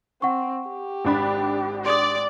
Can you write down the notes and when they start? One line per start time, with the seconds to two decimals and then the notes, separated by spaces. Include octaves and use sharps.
0.22 C4 F#5 C#6
0.69 G4
1.05 G#1 D4 B5
1.86 D5 C6 D#6